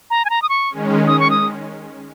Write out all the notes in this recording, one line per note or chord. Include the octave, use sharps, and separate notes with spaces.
A#5
G#5
A#5
D#6
C#6
D#3 G#3 C#4
D#6
C#6
D#6